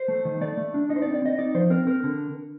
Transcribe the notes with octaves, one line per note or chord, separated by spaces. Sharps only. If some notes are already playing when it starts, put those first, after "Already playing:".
Already playing: C5
A3
D#3
A3 D5
A3
D4
D#4 D#5
C5
D5
C4
D5
C4 D#5
D#4 D5
F3 C5
C4 A#4
C4 A#4
D3